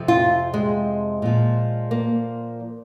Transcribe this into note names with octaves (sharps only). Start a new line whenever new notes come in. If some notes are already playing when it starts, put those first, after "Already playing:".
Already playing: F2 C3 F3
F4
G#3
A#2 F3
A#3